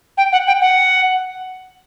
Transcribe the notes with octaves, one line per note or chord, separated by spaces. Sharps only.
G5
F#5
G5
F#5